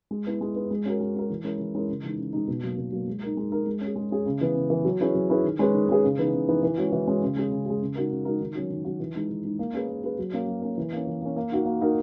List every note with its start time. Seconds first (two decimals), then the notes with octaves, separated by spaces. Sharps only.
0.11 G#3
0.26 B3 E4
0.41 G#3
0.56 B3 E4
0.71 G#3
0.85 C#4 F#4 A#4
1.01 G#3
1.15 C#4 F#4 A#4
1.30 E3
1.44 G#3 C#4 E4 A#4
1.59 E3
1.75 G#3 C#4 E4 A#4
1.90 C#3
2.04 E3 G#3 D#4
2.18 C#3
2.33 E3 G#3 D#4
2.48 B2
2.63 F#3 A#3
2.77 B2
2.93 F#3 A#3
3.07 G#3
3.23 D#4 A#4
3.37 G#3
3.52 D#4 A#4
3.66 G#3
3.81 C#4 G#4
3.96 G#3
4.11 C#4 G#4
4.26 C#3
4.41 E3 B3
4.56 C#3
4.70 E3 B3
4.85 F#3
5.00 C#4 E4 G#4 B4
5.14 F#3
5.30 C#4 E4 G#4 B4
5.44 D#3
5.59 G#3 C#4 G#4 B4
5.74 D#3
5.89 G#3 C#4 G#4 B4
6.04 C#3
6.18 E3 B3 D#4
6.33 C#3
6.48 E3 B3 D#4
6.63 E3
6.78 G#3 C#4 F#4
6.92 E3
7.07 G#3 C#4 F#4
7.22 C#3
7.36 G#3 C#4 G#4
7.52 C#3
7.66 G#3 C#4 G#4
7.81 C#3
7.95 G#3 D#4 F#4 A#4
8.10 C#3
8.25 G#3 D#4 F#4 A#4
8.40 D#3
8.55 F#3 C#4 F#4
8.70 D#3
8.85 F#3 C#4 F#4
9.00 E3
9.15 G#3 D#4
9.29 E3
9.44 G#3 D#4
9.59 A#3
9.73 C#4 G#4 B4
9.88 A#3
10.03 C#4 G#4 B4
10.19 F#3
10.33 A#3 C#4
10.47 F#3
10.62 A#3 C#4
10.78 E3
10.93 A#3 C#4
11.07 E3
11.22 A#3 C#4
11.36 A#3
11.52 D#4 F#4 A#4
11.66 A#3
11.81 D#4 F#4 A#4